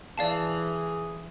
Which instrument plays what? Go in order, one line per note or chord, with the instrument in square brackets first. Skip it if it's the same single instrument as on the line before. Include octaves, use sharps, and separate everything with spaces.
[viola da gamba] E3 [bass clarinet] G#4 [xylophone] D5 F5 A5